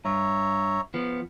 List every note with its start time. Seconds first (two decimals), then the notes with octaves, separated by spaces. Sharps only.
0.05 G2 C#5 E5 A#5
0.94 F3 B3